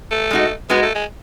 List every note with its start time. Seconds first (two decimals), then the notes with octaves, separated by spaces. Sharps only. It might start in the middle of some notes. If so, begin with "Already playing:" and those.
0.11 A3
0.31 G#3 D#4 F#4
0.70 G#3 B3 D#4 F#4
0.82 A3
0.95 G#3